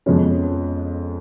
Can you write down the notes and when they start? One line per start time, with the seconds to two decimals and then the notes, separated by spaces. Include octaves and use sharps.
0.06 F2 F3 G#3 B3 C#4